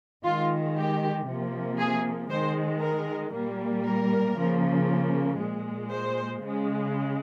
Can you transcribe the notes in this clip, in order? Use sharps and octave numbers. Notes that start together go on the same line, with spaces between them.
D#3 G#3 F4
G4
C3 F3 A#3
G#4
D#3 G#3 C5
A#4
A#2 G3 A#3
A#4
C#3 F3 A#3
A#2 G#3
C5
C#3 G#3